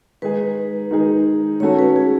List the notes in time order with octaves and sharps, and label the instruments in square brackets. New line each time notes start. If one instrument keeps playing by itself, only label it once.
[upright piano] D#3 G#3 D#4 G#4 [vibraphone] B4
[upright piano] D#3 G#3 D#4 G#4
[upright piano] D#3 A3 C#4 F#4 A4 [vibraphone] C#5
[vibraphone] B4
G#4